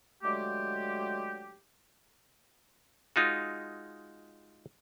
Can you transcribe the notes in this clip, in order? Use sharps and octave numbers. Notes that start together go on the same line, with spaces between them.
D3 F#3 G#3 A3 G4
G#3 D#4 F4 F#4